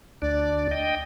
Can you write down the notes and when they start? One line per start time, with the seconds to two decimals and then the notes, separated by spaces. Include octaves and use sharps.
0.22 D2 D4 D5
0.71 D#5 G5